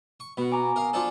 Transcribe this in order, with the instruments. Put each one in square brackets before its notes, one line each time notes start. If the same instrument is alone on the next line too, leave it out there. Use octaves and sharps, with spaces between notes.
[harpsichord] C#6
[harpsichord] B2 [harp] B3 F#4
[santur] G#5 [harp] A#5 D6
[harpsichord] A#4 F5 [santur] D#6
[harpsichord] F3 D4 A4 [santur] C5